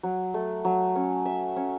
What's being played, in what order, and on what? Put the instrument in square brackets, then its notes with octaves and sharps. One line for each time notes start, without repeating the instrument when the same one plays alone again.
[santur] F#3
A3
F#3
C#4
E5
C#4